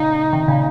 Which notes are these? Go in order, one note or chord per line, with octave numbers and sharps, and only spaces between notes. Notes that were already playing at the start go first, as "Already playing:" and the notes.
Already playing: A#2 C#3 D#4
C3 D#3
A#2 C#3